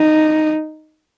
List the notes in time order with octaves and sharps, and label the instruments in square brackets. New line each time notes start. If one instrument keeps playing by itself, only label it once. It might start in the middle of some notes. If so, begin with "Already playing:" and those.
Already playing: [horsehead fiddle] D#4